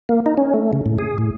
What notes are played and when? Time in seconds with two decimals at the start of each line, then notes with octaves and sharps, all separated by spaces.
0.09 A#3
0.26 D#4
0.37 C#4
0.54 A3
0.73 C#3
0.86 A2
0.98 G#4
1.18 A2